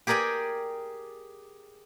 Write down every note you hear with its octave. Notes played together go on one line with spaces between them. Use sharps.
G4 G#4 A#4 D5 G5 G#5